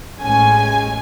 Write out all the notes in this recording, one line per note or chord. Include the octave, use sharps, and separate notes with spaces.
A1 A2 G#3 C#4 G#5